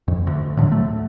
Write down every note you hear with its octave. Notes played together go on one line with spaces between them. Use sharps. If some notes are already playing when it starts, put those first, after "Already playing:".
F2
D2
A2 D3 F3 F#3
A3